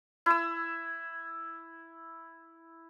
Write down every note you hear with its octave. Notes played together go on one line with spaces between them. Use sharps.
E4 E6